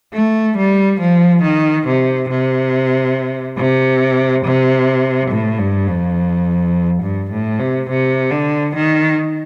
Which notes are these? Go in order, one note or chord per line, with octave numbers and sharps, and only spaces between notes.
A3
G3
F3
D#3
C3
C3
C3
C3
A2
G2
F2
G2
A2
C3
C3
D3
D#3